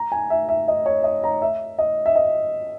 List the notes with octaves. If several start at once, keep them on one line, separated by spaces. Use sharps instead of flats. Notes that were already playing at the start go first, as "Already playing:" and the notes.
Already playing: A#5
G#5
E5
E5
D#5
C#5
D#5
A#5
E5
D#5
E5
D#5